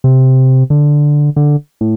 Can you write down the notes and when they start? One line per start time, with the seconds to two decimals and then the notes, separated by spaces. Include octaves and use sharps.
0.04 C3
0.70 D3
1.36 D3
1.81 A2